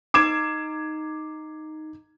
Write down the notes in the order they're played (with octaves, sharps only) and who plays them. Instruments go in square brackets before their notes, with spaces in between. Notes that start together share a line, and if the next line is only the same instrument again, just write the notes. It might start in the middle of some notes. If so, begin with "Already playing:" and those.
[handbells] D#4 C7 [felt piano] D6 G#6 E7